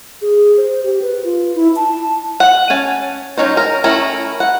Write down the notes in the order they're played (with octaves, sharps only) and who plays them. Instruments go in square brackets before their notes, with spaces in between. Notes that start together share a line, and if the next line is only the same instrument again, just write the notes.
[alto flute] G#4
C5
G4
B4
F4
E4
A5
[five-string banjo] F#5
C#4 G#5 A5
F#3 G#3 C#4 D#4 C5
A#4
A3 C#4 E4 A#4
F#5